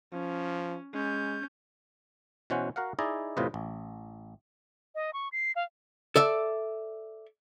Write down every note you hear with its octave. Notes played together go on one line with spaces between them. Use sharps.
F3 C#4
G#3 C#4 G6
B2 E3 C#4 C5 F#5
F#4 A#4 F5 F#5
D#4 E4 G#4 D5 D#5
E2 A2 C3 F4 B4 D#5
A1
D#5
C#6
C7
F5
A4 D5 E5